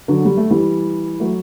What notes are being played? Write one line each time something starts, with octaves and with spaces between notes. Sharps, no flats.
D3 F#3
G3
A3
E3 G3
F#3 A3